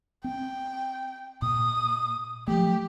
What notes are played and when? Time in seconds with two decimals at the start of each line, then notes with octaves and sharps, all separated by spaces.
0.24 C4 G5
1.42 A#2 D#6
2.48 F3 F#3 A3 G4